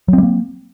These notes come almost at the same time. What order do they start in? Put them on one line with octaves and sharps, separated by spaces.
F#3 C4 G3 A#3